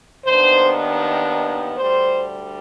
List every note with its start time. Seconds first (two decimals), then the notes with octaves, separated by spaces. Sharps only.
0.25 D#2 D#3 B3 D4 C5
1.77 D2 D3 G3 C5